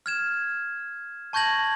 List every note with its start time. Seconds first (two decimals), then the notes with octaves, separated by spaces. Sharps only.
0.06 F6 G#6 E7
1.33 A5 C#6 G6 G#6 A#6 F#7